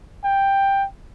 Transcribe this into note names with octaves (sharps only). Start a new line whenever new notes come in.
G5